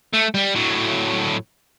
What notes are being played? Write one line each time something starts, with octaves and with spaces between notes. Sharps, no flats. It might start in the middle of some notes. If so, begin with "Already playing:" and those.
A3
G3
A2 F#3